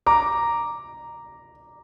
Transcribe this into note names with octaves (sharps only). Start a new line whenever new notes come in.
A#5 D6